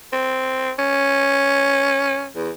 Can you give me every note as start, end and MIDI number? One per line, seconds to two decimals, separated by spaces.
0.13 0.72 60
0.79 2.27 61
2.35 2.51 40